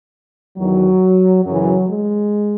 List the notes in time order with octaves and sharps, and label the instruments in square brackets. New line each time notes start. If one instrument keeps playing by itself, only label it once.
[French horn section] E2 D#3 F#3
F#2 C#3 E3 F#3
G#3